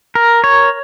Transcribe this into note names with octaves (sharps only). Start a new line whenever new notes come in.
A#4
C#5